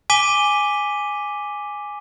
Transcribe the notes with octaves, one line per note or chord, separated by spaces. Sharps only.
G#5 D6 B6 D#7 G7